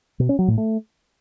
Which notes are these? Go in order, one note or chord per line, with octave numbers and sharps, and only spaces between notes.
B2
C#4
F#3
A2
A3